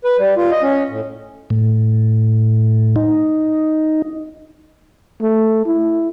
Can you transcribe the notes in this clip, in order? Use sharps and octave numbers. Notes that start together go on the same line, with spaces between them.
B4
G3
F4
D#5
C#4
A2
A2
D#4
A3
E4